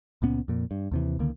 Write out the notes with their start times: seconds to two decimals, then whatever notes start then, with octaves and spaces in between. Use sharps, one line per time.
0.22 C#2 A#2 B3 C#4
0.48 F2 A#2
0.71 G2
0.91 D#2 C3 E3
1.19 C#2 D3 D#3 A#3